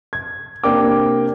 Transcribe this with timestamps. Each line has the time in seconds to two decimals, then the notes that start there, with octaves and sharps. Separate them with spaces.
0.13 G#6
0.64 C3 A#3 D4 G5 D6